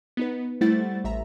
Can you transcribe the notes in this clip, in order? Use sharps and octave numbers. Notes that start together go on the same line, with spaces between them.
B3 D#4 B4
G3 A3 E4 C5 F#5 A6
A1 E5 A#5